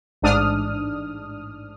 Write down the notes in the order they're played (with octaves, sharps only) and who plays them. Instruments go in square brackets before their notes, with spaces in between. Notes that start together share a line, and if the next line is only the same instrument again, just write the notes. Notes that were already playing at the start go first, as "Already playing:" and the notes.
[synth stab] A1 G#2 D4 D#6 F6